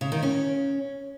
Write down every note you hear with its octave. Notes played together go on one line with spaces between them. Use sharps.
C#3
D#3
C#4